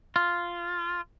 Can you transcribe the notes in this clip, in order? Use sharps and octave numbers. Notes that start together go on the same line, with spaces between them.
F4